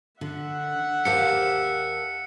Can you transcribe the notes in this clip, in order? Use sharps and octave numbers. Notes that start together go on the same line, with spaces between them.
D3 E5 F#5
D#2 G4 A#4 C5 F5 A5 C#7